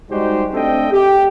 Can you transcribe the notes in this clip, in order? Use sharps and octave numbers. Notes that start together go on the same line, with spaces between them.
G3 G#3 D#4 F#4 G4 C5
A3 C4 D4 A4 D#5 G5
G4